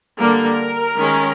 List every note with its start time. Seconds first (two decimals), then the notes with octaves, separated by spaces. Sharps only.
0.20 D3 G3 A#3 A#4
0.97 D#3 G#3 C#4